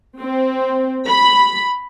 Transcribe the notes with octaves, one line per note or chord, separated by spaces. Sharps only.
C4
B5